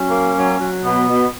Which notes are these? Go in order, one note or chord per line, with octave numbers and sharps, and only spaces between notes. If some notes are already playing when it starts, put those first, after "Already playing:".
Already playing: F#3 C#4
A#3
F#3
F#3
B2 B3
B2